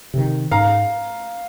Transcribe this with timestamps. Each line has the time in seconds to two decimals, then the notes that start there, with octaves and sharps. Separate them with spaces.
0.14 C3 D#3
0.51 G#2 F5 A#5